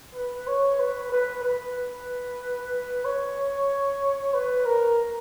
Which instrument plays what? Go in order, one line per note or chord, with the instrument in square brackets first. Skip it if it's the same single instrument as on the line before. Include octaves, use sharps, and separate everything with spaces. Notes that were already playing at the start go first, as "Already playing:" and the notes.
[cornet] B4
C#5
B4
B4
B4
C#5
B4
A#4